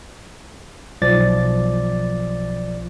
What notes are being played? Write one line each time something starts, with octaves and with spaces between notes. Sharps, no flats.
B1 F3 D5 A6